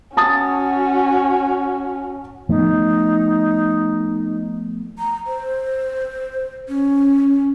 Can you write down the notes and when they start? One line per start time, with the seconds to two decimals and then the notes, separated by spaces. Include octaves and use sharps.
0.17 C#4 F#4 A5 D#6 A6
2.49 F3 A3 B3 D#4
4.99 A#5
5.27 C5
6.69 C#4